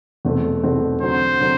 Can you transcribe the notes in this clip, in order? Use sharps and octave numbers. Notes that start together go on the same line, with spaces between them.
E2 B2 A3 C4
E2 B2 A3 C4
D3 F#3 C4 C5
D3 F#3 C4